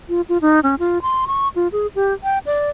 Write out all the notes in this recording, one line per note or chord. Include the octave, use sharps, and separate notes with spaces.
F4
F4
D#4
C#4
F4
C6
C#6
F4
G#4
G4
G5
D5